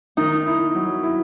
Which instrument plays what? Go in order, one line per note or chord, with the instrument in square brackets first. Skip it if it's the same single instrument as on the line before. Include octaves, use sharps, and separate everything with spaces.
[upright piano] D#3 [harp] D#4
[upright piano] E4
F#3
E4